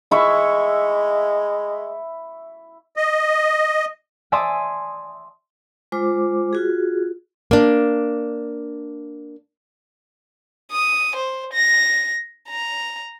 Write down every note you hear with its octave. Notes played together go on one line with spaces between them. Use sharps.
G#3 E4 E5 C#6
D#5
D5 E5 G#5 A5 C6 D#6
G#3 F4 C5 D6
F4 F#4 G#4
A#3 D4
D#6
C5
A#6
A#5